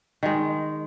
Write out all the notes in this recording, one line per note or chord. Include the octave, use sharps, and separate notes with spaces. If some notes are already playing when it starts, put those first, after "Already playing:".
D#3 G#3